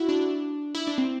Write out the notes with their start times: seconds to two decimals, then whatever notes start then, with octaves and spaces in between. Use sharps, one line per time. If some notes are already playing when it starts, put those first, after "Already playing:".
Already playing: E4 F#4
0.09 D4
0.74 E4
0.87 D4
0.98 C4